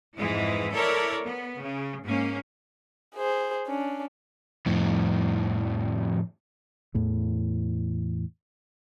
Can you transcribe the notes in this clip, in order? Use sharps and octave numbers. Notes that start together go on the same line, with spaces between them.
F2 G#2 E3 G#3 E4
E4 A4 A#4 C#5 D5
B3
C#3
G#2 A#3 C#4
G#4 C5
C#4 D4
F2 A2
E2 A2 E3